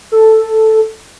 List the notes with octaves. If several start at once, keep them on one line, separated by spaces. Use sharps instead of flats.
A4